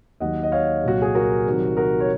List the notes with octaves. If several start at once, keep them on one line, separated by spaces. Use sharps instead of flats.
D#2 D#3 F#3 D#5 F#5
D#5
C#5 F5
C2 A#2 F#3 F#4
G#4
F#4 A#4
C2 C3 D#3 F#3
F#4 A#4
C#5